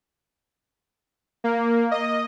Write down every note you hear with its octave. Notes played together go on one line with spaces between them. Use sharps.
A#3
D#5